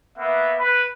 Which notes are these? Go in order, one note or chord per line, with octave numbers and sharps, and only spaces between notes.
A#3 B3 E5 F#5
B4